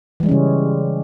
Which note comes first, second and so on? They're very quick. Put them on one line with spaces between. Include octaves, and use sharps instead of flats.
E3 G#3 G3 C#4 C#3